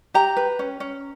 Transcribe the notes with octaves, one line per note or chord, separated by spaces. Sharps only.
G4 A#5
B4
C#4
C#4